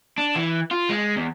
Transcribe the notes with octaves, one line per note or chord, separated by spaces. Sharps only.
D4
E3
F4
G#3
E2